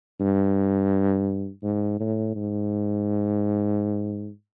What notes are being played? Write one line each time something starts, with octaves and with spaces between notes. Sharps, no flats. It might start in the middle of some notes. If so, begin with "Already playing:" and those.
G2
G#2
A2
G#2